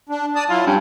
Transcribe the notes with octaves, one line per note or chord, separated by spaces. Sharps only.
D4
D5 A5 D#6
F#3 E4 F4
G2 C#4